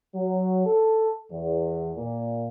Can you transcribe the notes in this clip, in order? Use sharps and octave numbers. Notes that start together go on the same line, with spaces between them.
F#3
A4
E2
A#2